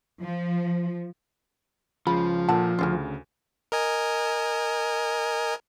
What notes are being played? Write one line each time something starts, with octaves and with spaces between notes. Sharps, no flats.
F3
C#2 C#3 F3 B5
A#2 D3 F#5 A5
D2 C#3 C#4 D#4 F4
A#4 D#5 G#5